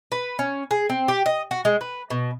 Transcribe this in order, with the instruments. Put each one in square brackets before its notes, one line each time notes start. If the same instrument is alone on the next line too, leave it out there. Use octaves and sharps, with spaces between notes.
[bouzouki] B4
C#4
G#4
C4
G4
D#5
F#4
G#3
B4
B2